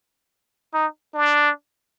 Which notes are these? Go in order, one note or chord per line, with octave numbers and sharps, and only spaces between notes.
D#4
D4